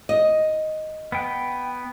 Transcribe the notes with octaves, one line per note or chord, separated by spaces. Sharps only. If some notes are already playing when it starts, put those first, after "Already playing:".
D#5
B3 G5